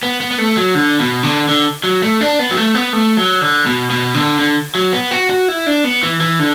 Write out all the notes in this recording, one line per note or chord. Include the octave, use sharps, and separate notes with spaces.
B3
B3
B3
A3
F#3
D3
B2
D3
D3
F#3
A3
D4
B3
F#3
A3
B3
A3
F#3
D3
B2
B2
D3
D3
F#3
B3
F#4
F#4
E4
D4
B3
E3
E3
D3